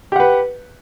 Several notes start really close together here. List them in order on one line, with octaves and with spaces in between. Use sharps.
G4 F#5 B4